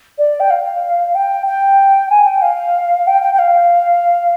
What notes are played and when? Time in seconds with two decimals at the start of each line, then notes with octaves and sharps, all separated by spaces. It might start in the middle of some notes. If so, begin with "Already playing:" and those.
0.18 D5
0.40 G5
0.50 F5
1.15 G5
1.46 G5
2.10 G#5
2.26 G5
2.42 F5
3.07 G5
3.22 G5
3.33 G5
3.38 F5